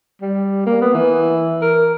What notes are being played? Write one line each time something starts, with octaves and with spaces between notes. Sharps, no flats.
G3
A#3
B3
E3
A#4